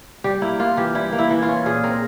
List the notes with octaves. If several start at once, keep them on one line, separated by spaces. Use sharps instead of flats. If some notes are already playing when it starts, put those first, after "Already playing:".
G3 G4
A#3 E4
A#3 F4
E3 G4
G3 E4
A#3
E4
E3
F4
C#4
A#2 G#4
C4 A#4